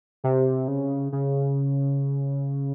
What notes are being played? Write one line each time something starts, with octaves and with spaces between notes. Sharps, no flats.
C3
C#3
C#3